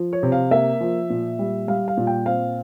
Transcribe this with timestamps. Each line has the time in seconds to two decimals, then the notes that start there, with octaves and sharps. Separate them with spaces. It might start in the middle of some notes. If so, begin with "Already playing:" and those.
Already playing: F3
0.13 C#5
0.23 C3
0.32 F5
0.51 A#3 E5
0.81 F3
1.10 A#2
1.39 G3
1.68 G3 F5
1.88 F5
1.97 A#2
2.07 G5
2.26 C4 F5